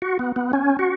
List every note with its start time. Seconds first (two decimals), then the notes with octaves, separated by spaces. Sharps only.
0.02 F#4
0.19 B3
0.36 B3
0.53 C#4
0.79 F#4